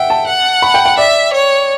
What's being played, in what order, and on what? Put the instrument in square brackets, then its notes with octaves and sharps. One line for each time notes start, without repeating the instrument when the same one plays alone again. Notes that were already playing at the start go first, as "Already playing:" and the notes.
Already playing: [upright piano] E5 F#5 [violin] G5
[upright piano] A5
[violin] F#5
[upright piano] B5
G5
G5
[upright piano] D5 [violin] E5
[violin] C#5